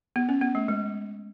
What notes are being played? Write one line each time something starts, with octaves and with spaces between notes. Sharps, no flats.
B3
C#4
B3
A3
G#3